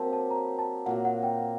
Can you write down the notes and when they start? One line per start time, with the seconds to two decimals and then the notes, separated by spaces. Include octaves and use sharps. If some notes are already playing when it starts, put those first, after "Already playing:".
Already playing: F#3 A#3 C4 G4 A#4 A5
0.13 A5
0.31 A#5
0.59 A5
0.86 A#2 F#3 A#3 F#5
1.05 F#5
1.23 G5